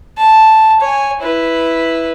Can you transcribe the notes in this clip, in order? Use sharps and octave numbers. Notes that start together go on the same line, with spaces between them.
A5
C#5 G#5
E4 B4